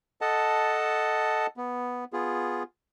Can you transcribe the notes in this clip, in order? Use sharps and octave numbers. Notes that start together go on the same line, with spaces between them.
A4 D#5 F#5 A5
B3
B3 F4 G#4